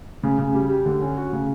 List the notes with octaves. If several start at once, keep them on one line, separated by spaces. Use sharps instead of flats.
C#3
C#3
G3
G4
D3
C#4
F#4
C#3